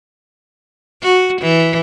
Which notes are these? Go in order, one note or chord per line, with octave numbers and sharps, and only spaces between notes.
F#4
E3